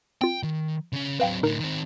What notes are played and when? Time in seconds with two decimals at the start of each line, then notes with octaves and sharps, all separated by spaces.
0.21 C4 F4 G5
0.43 D#3
0.93 C#3 C#4
1.20 F#3 C4 B4 F5 G5
1.43 A2 D3 D#4 A#4
1.60 D#3 C4